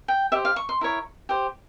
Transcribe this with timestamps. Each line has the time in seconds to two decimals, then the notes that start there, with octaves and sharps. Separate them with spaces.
0.08 G5
0.32 G4 C5 E5
0.45 F5
0.56 C#6
0.69 C6
0.81 E4 A#4 C#5
1.29 G4 C5